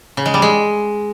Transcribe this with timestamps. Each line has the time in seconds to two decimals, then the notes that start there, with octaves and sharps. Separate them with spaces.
0.17 C#3
0.26 G#3
0.34 G3
0.42 G#3